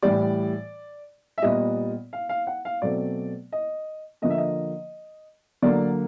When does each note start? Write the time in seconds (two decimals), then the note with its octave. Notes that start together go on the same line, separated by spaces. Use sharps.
0.02 A2 E3 G3 D5
1.38 E5
1.42 A#2 G3 B3 D#5
2.13 F5
2.29 F5
2.47 F#5
2.65 F5
2.82 B2 F#3 A3 C4 D5
3.52 D#5
4.22 D3 F3 A#3 D#5
4.30 E5
4.38 D#5
5.62 D3 F#3 A#3 D5